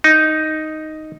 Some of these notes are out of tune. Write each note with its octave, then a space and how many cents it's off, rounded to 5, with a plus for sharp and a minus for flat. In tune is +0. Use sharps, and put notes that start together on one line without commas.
D#4 +0